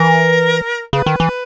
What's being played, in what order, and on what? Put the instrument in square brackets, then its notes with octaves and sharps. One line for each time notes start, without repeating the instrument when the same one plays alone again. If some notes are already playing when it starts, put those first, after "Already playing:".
Already playing: [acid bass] E3 [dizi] A#4
[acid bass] C#3 [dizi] B4
[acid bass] D#3
E3